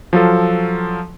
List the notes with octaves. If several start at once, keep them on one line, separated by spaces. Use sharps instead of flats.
F3 F#3 F4 A4